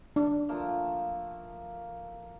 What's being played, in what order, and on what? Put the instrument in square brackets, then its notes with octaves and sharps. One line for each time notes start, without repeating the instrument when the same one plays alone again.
[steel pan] D4
[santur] F3 A3 A#3